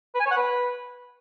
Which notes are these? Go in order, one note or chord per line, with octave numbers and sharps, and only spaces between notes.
B4
G#5
C#5
F#5
B4